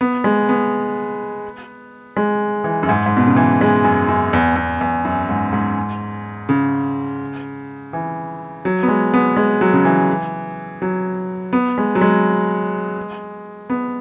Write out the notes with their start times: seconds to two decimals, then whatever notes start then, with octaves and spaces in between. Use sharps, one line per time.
0.01 B3
0.24 G#3
0.49 B3
2.17 G#3
2.64 E3
2.83 F#2
2.89 G#2
3.06 G#2
3.17 B2
3.27 C#3
3.36 E3
3.61 G#3
3.84 F#2
4.08 F#2
4.33 E2
4.56 E2
4.81 E2
5.05 F#2
5.29 G#2
5.53 G#2
6.49 C#3
7.93 E3
8.65 F#3
8.83 B3
8.88 G#3
9.14 B3
9.37 G#3
9.61 F#3
9.73 C#3
9.85 E3
10.82 F#3
11.53 B3
11.78 G#3
11.95 F#3
12.01 G#3
13.70 B3